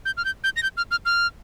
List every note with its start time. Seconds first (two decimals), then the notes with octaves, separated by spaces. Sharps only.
0.05 G6
0.17 F6
0.25 G6
0.44 G6
0.56 A#6
0.63 G6
0.77 F6
0.91 F6
1.05 F6